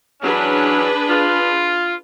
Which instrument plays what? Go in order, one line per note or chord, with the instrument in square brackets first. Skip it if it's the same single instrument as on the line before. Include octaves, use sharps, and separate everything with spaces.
[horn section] E3 F#3 C#4 [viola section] D4 G#4 B4
[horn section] F4